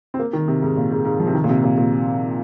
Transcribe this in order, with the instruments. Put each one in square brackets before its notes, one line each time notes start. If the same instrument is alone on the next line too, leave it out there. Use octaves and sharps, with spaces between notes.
[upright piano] C4
A#3
D#3
C3
G#2
A#2
G#2
G#2
F3
C3
D#3
A#2
C3
A#2
A#2